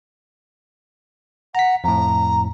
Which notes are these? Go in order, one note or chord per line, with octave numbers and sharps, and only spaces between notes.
F#5 A#5 B6
F2 A2 A#5